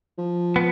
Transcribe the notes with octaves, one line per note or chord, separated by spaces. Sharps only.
F3
B3